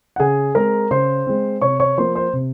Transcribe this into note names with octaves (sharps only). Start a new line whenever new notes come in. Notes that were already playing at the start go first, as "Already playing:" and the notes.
F#5
C#3 G#4 G#5
G#3 C4 A#4 A#5
C#3 C5 C6
G#3 C4
C3 C#5 C#6
C#5 C#6
F3 A#3 C5 C6
C5 C6
C3